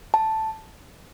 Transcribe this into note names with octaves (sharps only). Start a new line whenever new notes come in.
A5